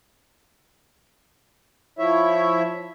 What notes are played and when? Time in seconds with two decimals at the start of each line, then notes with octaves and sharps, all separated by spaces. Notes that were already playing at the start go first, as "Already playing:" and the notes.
1.99 F3 E4 C#5 E5